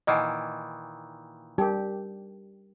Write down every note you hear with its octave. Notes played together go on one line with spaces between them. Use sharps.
A#2 D#3 E3 D#5 F#5 G#5
G3 D#4 G4 A#4